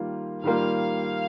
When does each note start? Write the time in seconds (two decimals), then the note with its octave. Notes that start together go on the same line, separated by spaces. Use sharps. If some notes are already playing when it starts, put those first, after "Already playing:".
Already playing: D#3 G3 A#3 F4
0.44 D#3 G3 A#3 F4 F5